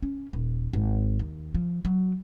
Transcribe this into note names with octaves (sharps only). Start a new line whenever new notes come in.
C#4
D#1
G#1
D#2
F3
F#3